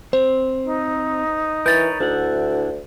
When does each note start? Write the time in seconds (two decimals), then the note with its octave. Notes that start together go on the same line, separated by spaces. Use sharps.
0.13 C4 C5
0.63 D#4
1.66 E3 A#4 B4 C#5 G6 A6
2.00 D2 D4 E4 F#5